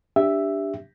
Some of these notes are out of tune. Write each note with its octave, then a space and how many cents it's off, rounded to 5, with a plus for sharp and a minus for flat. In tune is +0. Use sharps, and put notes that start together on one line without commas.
D4 +0 G4 +10 E5 +0